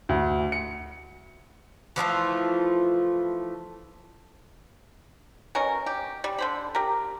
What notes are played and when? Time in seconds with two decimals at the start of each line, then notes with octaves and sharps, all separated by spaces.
0.09 D2
0.52 C#7
1.96 E3 F3 A3 F4
5.55 B2 C#4 A#4
5.86 G4
6.24 G3
6.39 D3 C5 B5
6.75 G4 A#4